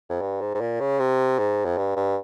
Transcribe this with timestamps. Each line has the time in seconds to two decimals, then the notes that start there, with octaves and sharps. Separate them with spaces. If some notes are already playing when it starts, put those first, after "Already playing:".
0.09 F2
0.22 G2
0.41 G#2
0.54 G#2
0.61 A#2
0.80 C#3
0.99 C3
1.39 G#2
1.65 F2
1.78 G2
1.96 G2